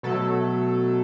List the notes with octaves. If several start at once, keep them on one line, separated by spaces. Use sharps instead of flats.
B2 F#3 A3 A4